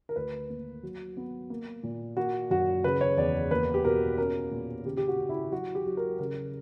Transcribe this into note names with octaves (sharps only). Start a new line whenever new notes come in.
A#4
D2 B4
A#3
F#3
B3
A#3
A#2
A#3 F#4
F#2 F#4
C#3 B4
C#5
E2 D5
A#3 B4
G4
B2 A#4
C#4 A#4
A#2
C#3 G4
G4
F#4
C#3
E4
F#3 F#4
G4
F#3
A#4
C#3 A#4